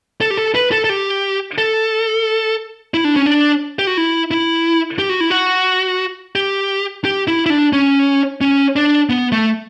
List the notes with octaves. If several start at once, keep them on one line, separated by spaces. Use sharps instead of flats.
A4
G4
A4
B4
A4
A4
G4
A4
E4
D4
C#4
D4
G4
F#4
E4
E4
G4
F#4
E4
F#4
G4
G4
E4
E4
D4
C#4
C#4
D4
B3
A3